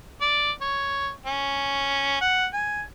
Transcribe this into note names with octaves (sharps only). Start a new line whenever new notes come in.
D5
C#5
C#4
F#5
G#5